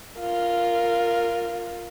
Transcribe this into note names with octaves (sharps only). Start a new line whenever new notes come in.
F4 A#4